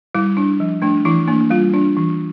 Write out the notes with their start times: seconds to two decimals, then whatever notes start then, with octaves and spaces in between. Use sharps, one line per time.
0.15 G3 E4
0.37 D4
0.60 F3
0.82 A3 D4
1.05 E3 E4
1.28 A#3 D4
1.50 G3 F4
1.74 D4
1.97 E3